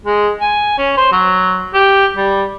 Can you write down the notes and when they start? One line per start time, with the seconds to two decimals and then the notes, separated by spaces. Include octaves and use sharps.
0.05 G#3
0.41 G#5
0.78 C#4
0.97 C5
1.12 F#3
1.74 G4
2.16 G3